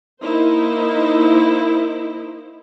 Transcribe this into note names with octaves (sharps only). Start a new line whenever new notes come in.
A#3 D#4 E4 C5